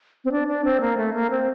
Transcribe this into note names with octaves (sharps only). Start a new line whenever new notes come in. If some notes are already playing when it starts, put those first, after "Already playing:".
C4
D4
D4
C4
A#3
A3
A#3
C4